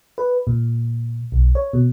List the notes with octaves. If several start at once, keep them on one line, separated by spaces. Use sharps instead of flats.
B4
A#2
B1
C#5
B2